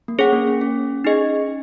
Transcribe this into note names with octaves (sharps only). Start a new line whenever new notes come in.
A#3
C#4 G#4 C#5 F#5
A#3
C#4
C#4
D#4 G#4 D#5